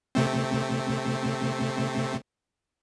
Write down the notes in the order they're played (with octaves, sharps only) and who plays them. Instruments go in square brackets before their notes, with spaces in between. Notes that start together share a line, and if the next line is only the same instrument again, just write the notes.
[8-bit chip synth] C3 A3 C4